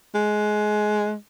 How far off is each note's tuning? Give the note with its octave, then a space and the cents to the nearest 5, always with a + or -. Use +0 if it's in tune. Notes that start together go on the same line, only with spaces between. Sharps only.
G#3 +20